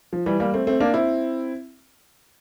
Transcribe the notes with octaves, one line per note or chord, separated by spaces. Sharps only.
F3
E3 G3
G3 A#3
A3 C4
A3 C4
A#3 D4
C4 E4